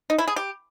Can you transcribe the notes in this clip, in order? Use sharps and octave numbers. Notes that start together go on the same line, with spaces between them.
D#4
E4
G#4
G4